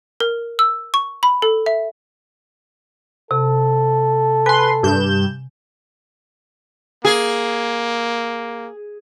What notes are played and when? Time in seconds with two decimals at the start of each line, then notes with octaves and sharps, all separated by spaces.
0.20 A#4
0.59 E6
0.94 C#6
1.23 B5
1.42 A4
1.66 E5
3.31 C3 A4
4.46 B4 G#5 C6
4.83 G2 G6 E7
7.05 A#3 G#4